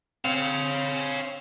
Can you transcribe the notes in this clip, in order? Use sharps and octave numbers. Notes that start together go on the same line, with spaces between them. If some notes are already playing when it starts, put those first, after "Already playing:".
C4 C#5 F5